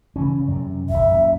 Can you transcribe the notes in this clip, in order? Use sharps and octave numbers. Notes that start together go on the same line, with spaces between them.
C#3 E3 C#4
F#2 C3
D1 G#1 E5
F#2 A#2